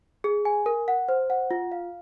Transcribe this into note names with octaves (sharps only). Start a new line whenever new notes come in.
G#4
G#5
A#4
F#5
C5
F#5
F4
F5